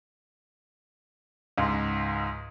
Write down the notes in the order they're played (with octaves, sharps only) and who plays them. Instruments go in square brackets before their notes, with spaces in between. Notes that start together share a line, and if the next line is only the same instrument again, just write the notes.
[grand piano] C#2 G#2